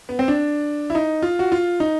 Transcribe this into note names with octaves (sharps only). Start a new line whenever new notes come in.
B3
C4
D4
E4
D#4
F4
F#4
F4
D#4